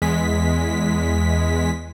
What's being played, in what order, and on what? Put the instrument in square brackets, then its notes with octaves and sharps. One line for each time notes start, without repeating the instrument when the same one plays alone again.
[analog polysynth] E2 G#3 B6